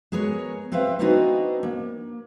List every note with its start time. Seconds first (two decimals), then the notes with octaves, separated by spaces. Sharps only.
0.12 G#3 B3 G#4 A#4 C#5
0.72 C4 B4 C5 E5 F5
0.99 B3 C4 D4 D#4 F#4 B4
1.63 A#3